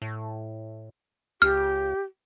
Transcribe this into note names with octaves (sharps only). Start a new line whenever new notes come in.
A2
C#2 G4 F6